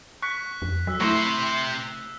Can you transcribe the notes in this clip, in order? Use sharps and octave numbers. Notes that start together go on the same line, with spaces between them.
C#6 F#6 B6
F2
F#3 E6 B6
C3 A3 E4 C5 C6 C#6